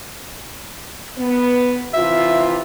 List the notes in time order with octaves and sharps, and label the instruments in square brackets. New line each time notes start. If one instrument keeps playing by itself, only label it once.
[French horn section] B3
[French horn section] C3 E3 F4 [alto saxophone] E5